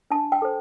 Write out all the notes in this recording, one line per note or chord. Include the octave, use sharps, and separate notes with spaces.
D4 A5
G5
A4 C5